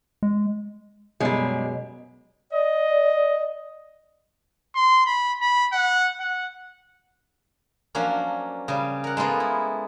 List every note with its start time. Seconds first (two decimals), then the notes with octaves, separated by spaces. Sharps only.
0.23 G#3
1.20 F#2 B2 G3 G#3
2.52 D5 D#5
4.75 C6
5.06 B5
5.41 B5
5.72 F#5
6.20 F#5
7.95 F3 F#3 A#3 C#4 D4
8.68 C#3 G3
9.04 A#4 F#5
9.17 G#3 A#3 B3 F4 A4
9.40 E4